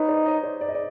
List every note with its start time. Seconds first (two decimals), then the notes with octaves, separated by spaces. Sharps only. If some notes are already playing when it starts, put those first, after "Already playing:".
Already playing: D#4 B4 C#5
0.08 C5 D5
0.26 C#5 D#5
0.43 C5 D5
0.61 D5
0.69 D#5
0.75 D5